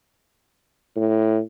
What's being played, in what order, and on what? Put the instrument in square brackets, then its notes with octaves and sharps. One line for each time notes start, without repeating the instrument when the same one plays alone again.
[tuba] A2